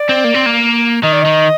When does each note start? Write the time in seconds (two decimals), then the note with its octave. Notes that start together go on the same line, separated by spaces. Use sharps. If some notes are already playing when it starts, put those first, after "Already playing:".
Already playing: D5
0.09 C4
0.24 A#3
0.34 C4
0.46 A#3
1.03 D#3 D#5
1.13 D5
1.22 D#3 D#5